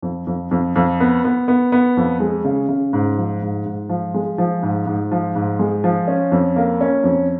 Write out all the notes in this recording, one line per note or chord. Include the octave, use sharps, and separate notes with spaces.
F2
F2
F2
F2
B3
B3
B3
B3
F2
G#3
C#3
C#3
G#2
F3
G#2
G#2
F3
G#3
F3
G#2
G#2
F3
G#2
G#3
F3
C#4
F2
A#3
C#4
F2